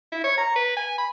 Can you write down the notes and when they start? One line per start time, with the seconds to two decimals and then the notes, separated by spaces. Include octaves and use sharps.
0.12 E4
0.24 C#5
0.37 A#5
0.55 B4
0.76 G#5
0.98 B5